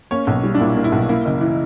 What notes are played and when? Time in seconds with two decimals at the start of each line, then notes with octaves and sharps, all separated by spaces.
0.11 A#3 C#4 C#5
0.27 B1
0.43 G3
0.54 D4
0.60 A#2 E4
0.76 A#3
0.84 E4
0.92 B1
1.09 A#3 E4
1.25 F#1
1.40 E3